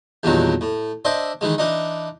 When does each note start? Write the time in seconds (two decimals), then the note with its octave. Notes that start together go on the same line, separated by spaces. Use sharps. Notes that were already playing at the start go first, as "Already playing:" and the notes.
0.23 E2 G2 A#2 D#3 F#3
0.61 A2
1.05 D4 C5 D#5 E5
1.41 D#3 E3 G#3
1.58 E3 D4 D#4